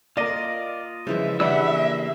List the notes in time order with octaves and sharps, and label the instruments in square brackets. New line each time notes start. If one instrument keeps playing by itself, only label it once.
[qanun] A#3 C6 [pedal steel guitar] F4 D#5 [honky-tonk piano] A#4 D5
[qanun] C#3 E3 G#3 [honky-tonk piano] F3 [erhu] E5
[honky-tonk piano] E3 D4 [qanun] G4 A5 [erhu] E5 [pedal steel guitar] F#5 B5 E6
[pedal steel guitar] A#3